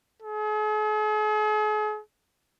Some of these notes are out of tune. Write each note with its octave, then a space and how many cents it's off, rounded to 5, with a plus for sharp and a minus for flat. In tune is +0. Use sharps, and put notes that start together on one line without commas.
G#4 +45